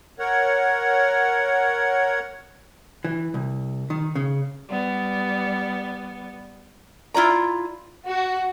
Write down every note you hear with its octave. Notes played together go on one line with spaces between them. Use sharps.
A#4 C#5 F#5
E3
C2
D#3
C#3
G3 B3 D5
E4 F4 D5 A#5
F#4